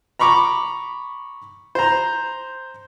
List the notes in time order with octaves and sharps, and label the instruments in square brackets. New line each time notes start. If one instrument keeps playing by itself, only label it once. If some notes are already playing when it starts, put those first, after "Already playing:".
[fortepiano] A#5 B5 C#6 D6
C5 A#5